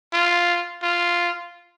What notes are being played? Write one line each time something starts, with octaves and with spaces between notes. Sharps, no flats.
F4
F4